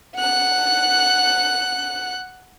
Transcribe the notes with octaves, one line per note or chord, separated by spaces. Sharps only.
F#5 F#6